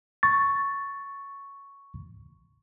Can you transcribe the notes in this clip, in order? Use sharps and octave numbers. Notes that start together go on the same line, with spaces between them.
C#6 A6